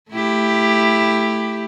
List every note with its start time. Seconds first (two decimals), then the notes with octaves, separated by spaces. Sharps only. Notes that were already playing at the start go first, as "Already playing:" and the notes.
0.11 A3 E4 G4